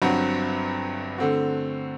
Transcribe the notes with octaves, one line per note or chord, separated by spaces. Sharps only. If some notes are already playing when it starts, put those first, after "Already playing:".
G1 G2 F#3 C4 F#4
D3 A3 C4 F#4